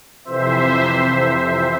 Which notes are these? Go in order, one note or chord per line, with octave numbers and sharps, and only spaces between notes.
F2 C3 E3 C5 E5